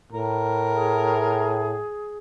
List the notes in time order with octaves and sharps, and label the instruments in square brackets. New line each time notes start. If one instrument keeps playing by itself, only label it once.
[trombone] A2 [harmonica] A#4
[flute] G#4